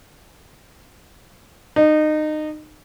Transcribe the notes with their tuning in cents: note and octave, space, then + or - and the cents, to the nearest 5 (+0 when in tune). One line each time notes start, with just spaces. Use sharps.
D#4 -25